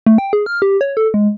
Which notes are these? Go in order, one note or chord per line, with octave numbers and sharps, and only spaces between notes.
A3
G5
G#4
F6
G4
C#5
A4
G#3